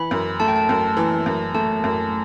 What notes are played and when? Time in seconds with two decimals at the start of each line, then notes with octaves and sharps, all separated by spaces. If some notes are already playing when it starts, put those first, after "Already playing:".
Already playing: E3 B5
0.11 F#2
0.40 A3 A5
0.48 G5
0.56 A5
0.69 F#2
0.97 E3
1.26 F#2
1.54 A3 A5
1.84 F#2